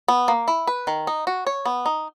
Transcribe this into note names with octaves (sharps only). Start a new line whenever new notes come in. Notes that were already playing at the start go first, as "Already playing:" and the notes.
B3
A#3
E4
B4
D#3
D#4
F#4
C#5
B3
D#4